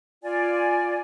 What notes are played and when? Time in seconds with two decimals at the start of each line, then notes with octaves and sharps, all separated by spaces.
0.23 F4 D5 G#5